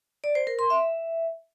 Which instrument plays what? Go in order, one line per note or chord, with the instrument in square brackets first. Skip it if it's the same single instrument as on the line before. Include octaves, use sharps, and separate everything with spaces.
[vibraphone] D5
C5
A#4
C6
E5